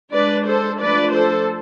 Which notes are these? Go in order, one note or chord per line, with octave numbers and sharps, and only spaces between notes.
G#3 D4 B4 D5
A4 C5
F3 A3 D4 B4 D5
A4 C5